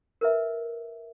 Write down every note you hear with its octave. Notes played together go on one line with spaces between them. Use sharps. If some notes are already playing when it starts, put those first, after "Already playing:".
A#4 B4 E5